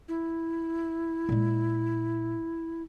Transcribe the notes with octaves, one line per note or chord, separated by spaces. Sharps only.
E4
A#2 G#3